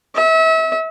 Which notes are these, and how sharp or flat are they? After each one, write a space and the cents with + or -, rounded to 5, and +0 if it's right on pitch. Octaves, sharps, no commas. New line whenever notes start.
E5 -35